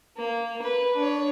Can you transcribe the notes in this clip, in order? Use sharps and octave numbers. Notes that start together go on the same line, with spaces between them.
A#3
B4
D4 C#5